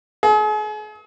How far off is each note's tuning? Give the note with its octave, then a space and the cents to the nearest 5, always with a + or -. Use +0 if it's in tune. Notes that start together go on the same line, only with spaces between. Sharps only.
G#4 +40